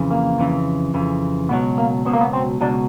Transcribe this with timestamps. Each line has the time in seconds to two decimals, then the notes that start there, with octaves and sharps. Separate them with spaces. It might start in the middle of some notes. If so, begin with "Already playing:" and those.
Already playing: F2 C#3 E3
0.11 A#3
0.38 F2 C#3 E3
0.94 F2 C#3 E3
1.49 C#2 B2 F#3 B3
1.78 A#3
2.05 C#2 B2 F#3 B3
2.13 A#3
2.21 B3
2.33 C4
2.61 C#2 B2 F#3 D4